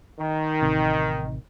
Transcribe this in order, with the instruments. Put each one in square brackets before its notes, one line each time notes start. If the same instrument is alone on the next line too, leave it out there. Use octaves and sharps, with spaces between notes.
[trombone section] D#3
[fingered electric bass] A1 C3